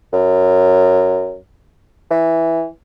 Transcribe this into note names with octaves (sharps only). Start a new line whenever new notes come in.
F#2
E3